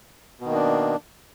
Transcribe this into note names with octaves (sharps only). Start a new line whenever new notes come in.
B2 D#3 A#3 D4